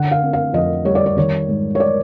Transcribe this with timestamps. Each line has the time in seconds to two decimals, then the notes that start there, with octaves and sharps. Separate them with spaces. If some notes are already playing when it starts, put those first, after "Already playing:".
Already playing: D3 F#5
0.11 F5
0.22 C4
0.33 F5
0.53 F2 D#5
0.85 G3 C#5
0.95 D5
1.06 C#5
1.17 D#3 C#5
1.48 G#2
1.75 C#5
1.80 D5